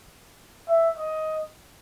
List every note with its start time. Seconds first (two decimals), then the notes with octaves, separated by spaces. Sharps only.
0.68 E5
0.97 D#5